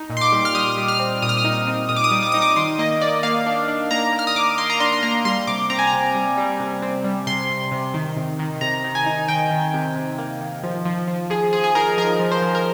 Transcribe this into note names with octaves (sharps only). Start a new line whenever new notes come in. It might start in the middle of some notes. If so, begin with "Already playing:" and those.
Already playing: D#4
A#2
C6
D6
G3
F6
G3 D#6
G3
F6
C4
A#2 D#6
F6
D#6
D#4
C4
A#2 D#6
D6
D#6
G3
D6
D#4 D#6
D6
D#3 C6
A#3 D#5
A#3 D5
A#3 F5
D4
D4
A#3 A#5
A#3
F6
D#6
A#3 D6
A#3 C6
A#5
D4 C6
C6
A#3 A#5
G3 C6
C3 D6
C4 A#5
G#5
A#5
C3
G3
G3
C3
C4
G3
C3 C6
C3
C3
D#3
C3
D#3
C3 A#5
D#3
G#5
D#4
D#3 G5
D#3
C3
C3
A#3
D#3
F3
F3
F3
F3 G#4
F3 G#4
G#4
D#4 A#4
F3 A#4
F3
C5
F3
A#4